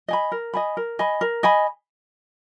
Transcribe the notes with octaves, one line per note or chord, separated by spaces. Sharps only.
D#5 G#5 B5
A#4
D#5 G#5 B5
A#4
D#5 G#5 B5
A#4
D#5 G#5 B5